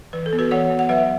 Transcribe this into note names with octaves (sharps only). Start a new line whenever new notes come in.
E3 B4
A4
B3
F#4 B4
E3 C#5 F#5
B3
F#5
F#3 B4 E5